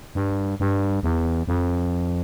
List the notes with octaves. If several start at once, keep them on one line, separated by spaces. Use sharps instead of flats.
G2
G2
E2
F2